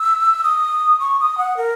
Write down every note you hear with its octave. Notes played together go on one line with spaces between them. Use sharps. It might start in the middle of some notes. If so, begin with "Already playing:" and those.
Already playing: E6
D#6
C#6
D#6
F#5
A#4